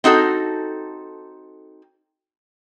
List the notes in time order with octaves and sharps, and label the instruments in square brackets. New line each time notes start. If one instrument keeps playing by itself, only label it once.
[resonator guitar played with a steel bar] C4 D#4 F#4 A4